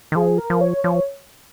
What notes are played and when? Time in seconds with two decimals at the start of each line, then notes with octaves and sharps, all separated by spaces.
0.12 D#3
0.16 F3 G#4
0.38 A#4
0.50 F3
0.61 C#5
0.84 F3 C#5